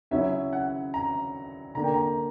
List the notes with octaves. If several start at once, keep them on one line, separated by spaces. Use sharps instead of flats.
C#3 F#3 C#4 E4 E5
F#5
A#5
D3 A#3 D4 A#5
G5
A#5